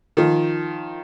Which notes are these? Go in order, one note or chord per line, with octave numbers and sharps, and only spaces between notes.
D#3 F3